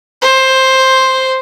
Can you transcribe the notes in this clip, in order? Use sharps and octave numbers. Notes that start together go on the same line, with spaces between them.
C5